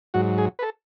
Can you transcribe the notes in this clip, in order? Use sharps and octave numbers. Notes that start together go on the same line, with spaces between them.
G#2 F#3 F#4
G#4
B4
A4